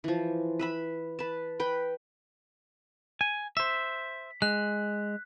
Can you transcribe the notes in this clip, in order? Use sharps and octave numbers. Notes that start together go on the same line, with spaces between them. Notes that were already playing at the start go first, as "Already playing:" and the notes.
E3 F3
B4 E5 B5
B4 A5
B4 G5
G#5
C5 E5 B6
G#3 F#6